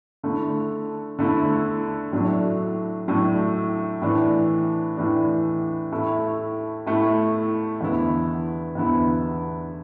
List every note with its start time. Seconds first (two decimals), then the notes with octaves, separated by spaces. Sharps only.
0.23 D3 A3 E4
1.19 D3 A3 E4
2.12 A2 F#3 A3 D4
3.08 A2 F#3 A3 D4
4.02 A2 E3 D4
4.97 A2 E3 D4
5.92 A2 A3 E4
6.86 A2 A3 E4
7.81 E2 D3 B3 E4
8.75 E2 D3 B3 E4